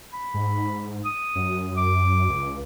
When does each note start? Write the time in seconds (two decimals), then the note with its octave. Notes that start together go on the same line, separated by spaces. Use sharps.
0.13 B5
0.34 G#2
1.05 D#6
1.35 F#2
1.77 D6
2.29 C#2